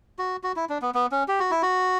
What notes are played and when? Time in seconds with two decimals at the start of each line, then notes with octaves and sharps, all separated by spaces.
0.19 F#4
0.43 F#4
0.56 E4
0.69 D4
0.82 B3
0.95 B3
1.12 C#4
1.28 G4
1.40 F#4
1.51 E4
1.62 F#4